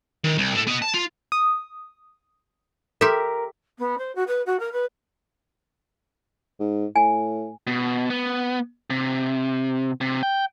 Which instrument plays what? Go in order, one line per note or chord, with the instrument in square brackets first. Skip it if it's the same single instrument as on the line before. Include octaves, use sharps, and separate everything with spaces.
[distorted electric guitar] D#3
C2
A2 A4
B3 D#5
A5
F4
[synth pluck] D#6
[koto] G4 E5 [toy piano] A4 C6 [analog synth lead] A#4
[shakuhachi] B3
C5
F#4
B4
F#4
A#4
B4
[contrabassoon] G#2
[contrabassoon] A2 [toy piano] G#5
[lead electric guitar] B2
B3
C3
C3
G5